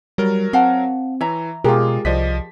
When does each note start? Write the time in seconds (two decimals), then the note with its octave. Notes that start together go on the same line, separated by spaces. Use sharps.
0.18 F#3 G3 A#4
0.53 C4 F5 F#5 A5
1.21 E3 C#5 E5 A#5
1.64 B2 G#3 F4 G4 G#4 A#4
2.05 C2 F3 D5 D#5 B6